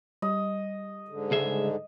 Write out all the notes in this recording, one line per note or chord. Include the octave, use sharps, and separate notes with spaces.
G3 D#5
G#2 D3
C#2 G#4 E5